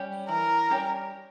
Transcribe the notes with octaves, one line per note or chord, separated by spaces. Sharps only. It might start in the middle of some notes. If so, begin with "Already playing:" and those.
Already playing: G3 C#4 G4 C#5
E3 A#4
G3 C#4 G4 C#5